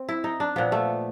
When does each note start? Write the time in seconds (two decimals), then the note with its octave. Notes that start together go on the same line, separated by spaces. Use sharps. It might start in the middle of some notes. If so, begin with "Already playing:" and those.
Already playing: C4
0.09 E4
0.24 D#4
0.40 D4
0.56 A#2 F3 B3
0.72 A3